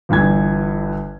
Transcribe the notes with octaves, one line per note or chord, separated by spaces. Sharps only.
G1 G2 E3 G#6